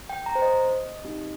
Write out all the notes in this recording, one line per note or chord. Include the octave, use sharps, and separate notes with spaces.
G5
A#5
C5
D#5
C4 D#4 G4